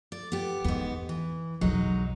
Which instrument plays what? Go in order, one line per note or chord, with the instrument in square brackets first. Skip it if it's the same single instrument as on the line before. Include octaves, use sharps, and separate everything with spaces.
[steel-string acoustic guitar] D5
B3 G4
[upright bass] E2 [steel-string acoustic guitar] G#2 B3
[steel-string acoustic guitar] E3
[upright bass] B1 F2 [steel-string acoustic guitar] F#3 G#3 D#4